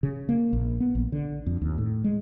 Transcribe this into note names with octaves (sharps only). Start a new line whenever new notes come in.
C#3
A#3
A#1
B3
A#1
D3
F2
D#2
A2
G#3